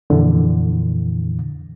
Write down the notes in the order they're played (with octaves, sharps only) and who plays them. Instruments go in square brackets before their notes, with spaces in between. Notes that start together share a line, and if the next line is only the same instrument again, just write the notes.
[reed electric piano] F2 A#2 D3 E3